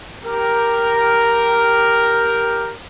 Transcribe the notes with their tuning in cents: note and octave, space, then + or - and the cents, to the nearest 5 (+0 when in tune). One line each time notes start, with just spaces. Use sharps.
G4 +0 A#4 +0